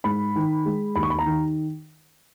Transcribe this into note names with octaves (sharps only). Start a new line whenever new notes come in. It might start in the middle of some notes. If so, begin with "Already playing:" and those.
G#2 B5
D#3
G#3
D#2 B5
C#6
B5
A#5
D#3